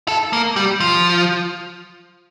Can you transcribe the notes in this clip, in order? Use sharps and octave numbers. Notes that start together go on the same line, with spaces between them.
A4
A#3
G3
F3